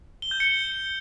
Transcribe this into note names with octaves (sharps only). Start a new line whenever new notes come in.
G7
G6
C#7